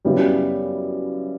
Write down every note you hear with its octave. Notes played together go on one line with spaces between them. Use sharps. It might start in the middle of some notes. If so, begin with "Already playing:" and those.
F#2 C#3 F#3 G3 B3 E4